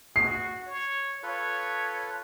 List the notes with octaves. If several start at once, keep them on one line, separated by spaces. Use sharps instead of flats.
F#4 C7
C#5
F4 A4 B4 C#5